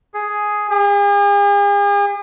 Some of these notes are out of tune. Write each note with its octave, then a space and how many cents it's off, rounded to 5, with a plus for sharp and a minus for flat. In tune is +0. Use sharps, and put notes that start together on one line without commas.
G#4 +5
G#4 -45